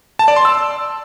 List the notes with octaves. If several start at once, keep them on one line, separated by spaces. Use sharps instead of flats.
A5
D5
C6
E6